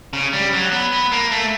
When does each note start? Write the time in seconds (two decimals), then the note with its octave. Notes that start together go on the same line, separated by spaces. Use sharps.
0.13 C#3
0.33 G3
0.53 F#3
0.72 B3
0.92 B3
1.12 A#3
1.31 A3